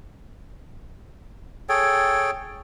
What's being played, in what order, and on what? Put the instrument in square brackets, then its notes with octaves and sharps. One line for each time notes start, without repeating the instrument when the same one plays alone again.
[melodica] G#4 A4 C#5 G5